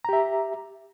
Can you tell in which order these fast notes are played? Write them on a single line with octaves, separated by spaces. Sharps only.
A#5 G4 E5